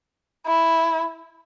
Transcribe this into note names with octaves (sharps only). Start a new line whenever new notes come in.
E4